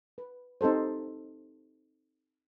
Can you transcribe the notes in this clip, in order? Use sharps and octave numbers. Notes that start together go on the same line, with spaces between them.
B4
C4 D#4 G4 A4 C5